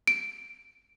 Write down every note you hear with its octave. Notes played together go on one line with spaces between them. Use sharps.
D7